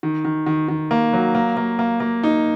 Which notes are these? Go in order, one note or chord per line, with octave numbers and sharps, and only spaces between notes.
D#3
D#3
D#3
D#3
A#3
F#3
A#3
A#3
A#3
A#3
D#4